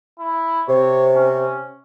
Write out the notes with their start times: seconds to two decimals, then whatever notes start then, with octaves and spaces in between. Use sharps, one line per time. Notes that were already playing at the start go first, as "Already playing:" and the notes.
0.19 E4
0.68 C3 C#5
1.16 C#4